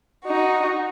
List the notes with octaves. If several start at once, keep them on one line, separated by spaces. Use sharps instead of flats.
D#4 F#4